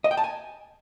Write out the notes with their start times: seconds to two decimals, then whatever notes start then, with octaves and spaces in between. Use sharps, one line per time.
0.04 D#5
0.11 G5
0.17 A5
0.24 G#5